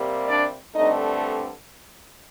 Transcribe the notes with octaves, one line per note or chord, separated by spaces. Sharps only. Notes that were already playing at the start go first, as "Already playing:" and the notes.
Already playing: C3 G3 A#3
D4 D5
G2 D3 A3 C4 D#4 D#5